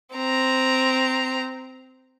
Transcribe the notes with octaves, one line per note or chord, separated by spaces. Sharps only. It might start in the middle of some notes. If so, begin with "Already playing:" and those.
C4 A#5